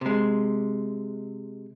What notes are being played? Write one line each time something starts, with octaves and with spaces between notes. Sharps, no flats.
C3 G#3